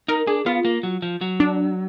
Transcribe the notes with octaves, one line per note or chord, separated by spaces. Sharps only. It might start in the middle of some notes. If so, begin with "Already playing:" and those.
D#4 A#4
D4 G#4
B3 F4
A#3
F#3
F3
F#3
D4